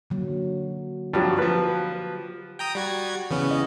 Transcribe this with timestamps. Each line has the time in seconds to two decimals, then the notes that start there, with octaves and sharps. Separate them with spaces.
0.10 D3 F#3 A#3
1.14 G2 F3 F#3 F#4 G4
1.38 F3 B4
2.59 G5 A#5 D#6
2.75 G3 F#4 G#6
3.31 C#3 E3 B3 C#4
3.51 D#5